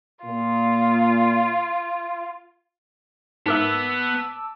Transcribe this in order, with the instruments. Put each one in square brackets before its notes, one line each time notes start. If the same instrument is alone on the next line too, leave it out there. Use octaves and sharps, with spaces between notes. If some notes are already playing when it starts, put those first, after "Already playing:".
[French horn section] A#2 [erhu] F4
[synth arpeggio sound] G#2 A#4 E5 [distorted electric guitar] B3 [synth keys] A5 D6 E6